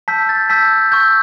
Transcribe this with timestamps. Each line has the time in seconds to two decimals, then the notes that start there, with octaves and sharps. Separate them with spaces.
0.08 A5 E6 G6 B6
0.29 A6
0.50 A5 E6 G6 B6
0.92 C#6 E6 G6